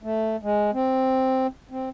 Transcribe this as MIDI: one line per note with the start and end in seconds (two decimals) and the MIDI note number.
0.03 0.37 57
0.43 0.71 56
0.73 1.47 60
1.71 1.89 60